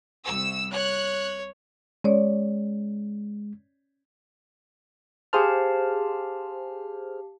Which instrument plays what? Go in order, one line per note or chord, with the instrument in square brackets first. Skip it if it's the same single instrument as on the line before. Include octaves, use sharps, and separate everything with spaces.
[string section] C2 E6
[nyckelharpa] C#5 [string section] F#6
[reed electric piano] G#3 [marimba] C#4 C#5 D5
[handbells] G4 F5 A5 [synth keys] G#4 C5 F6